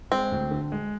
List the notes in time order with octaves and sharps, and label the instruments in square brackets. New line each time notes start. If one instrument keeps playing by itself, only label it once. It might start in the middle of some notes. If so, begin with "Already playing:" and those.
[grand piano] G#3 [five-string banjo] C4
[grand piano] D2
D3
G#3